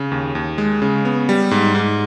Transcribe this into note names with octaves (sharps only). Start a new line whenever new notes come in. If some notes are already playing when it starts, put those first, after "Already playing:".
Already playing: C#3
D#2
D#2
G#3
C#3
B3
G3
G#2
G#2